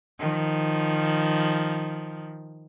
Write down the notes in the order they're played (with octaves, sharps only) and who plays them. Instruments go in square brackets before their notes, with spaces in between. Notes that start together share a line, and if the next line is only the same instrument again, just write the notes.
[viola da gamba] D#3 F3